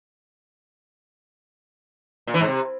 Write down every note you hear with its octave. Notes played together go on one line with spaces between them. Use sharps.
A#2
E3
G#2
C3